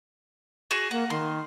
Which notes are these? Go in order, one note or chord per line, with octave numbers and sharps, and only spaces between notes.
F#4 G#4 C#6
A#3 F#5
D#3 C6